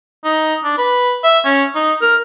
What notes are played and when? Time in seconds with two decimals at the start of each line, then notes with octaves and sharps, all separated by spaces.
0.25 D#4
0.64 D4
0.78 B4
1.24 E5
1.45 C#4
1.75 D#4
2.02 A#4